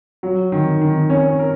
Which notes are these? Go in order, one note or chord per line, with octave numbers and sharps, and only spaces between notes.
F#3
D#3
D#3
C#4
A#4